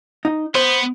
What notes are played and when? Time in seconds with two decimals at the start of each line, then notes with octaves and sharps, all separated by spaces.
0.25 D#4
0.55 B3 C5